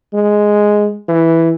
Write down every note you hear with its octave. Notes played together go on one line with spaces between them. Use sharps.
G#3
E3